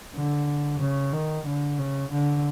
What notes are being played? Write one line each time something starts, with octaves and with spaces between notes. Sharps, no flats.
D3
C#3
D#3
D3
C#3
D3